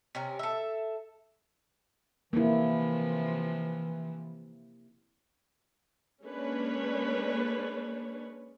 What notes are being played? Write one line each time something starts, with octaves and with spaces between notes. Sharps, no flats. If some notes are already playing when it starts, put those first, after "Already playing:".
C3 C#4 A#4
A4 E5
C3 E3 F3 A#3 E4
G#3 A#3 C#4 D4 B4 C#5